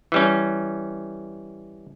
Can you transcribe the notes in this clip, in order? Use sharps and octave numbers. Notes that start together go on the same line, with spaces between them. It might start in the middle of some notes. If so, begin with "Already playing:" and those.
E3 G3 C#4